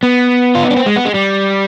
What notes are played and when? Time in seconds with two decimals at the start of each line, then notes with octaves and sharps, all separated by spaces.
0.03 B3
0.55 F4
0.63 D#4
0.70 D4
0.76 C4
0.86 G#3
0.96 B3
1.05 G#3
1.14 G3